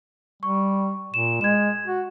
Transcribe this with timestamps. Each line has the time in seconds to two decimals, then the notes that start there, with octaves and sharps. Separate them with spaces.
0.43 G3 C#6
1.14 A#2 E7
1.41 G#3 G#6 E7
1.87 F#4